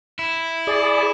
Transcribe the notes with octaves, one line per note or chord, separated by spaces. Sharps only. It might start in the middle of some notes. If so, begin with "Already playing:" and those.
E4
G#4 D5